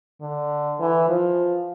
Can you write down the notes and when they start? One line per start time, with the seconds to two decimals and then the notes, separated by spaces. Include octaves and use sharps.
0.21 D3
0.79 E3
1.09 F3